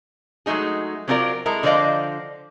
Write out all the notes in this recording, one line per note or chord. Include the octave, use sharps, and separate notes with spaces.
F#3 G#3 A3 D#4 G#4
F#3 C4 D4 F4 A#4 D5
G#3 E4 A4 A#4
D3 F3 C5 D5 D#5 F5